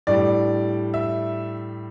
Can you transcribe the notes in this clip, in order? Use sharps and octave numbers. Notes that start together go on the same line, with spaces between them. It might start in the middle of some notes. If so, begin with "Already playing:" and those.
A2 G3 D4 D5
E5